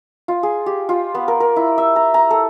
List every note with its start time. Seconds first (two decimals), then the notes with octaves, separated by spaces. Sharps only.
0.28 F4
0.43 G#4
0.66 G4
0.89 F4
1.15 B3
1.28 A#4
1.40 A#4
1.56 E4
1.78 E5
1.96 A#5
2.14 A#5
2.31 A4